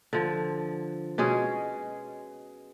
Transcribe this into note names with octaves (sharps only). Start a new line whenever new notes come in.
D3 F3
B2 G#3 C#4 G#4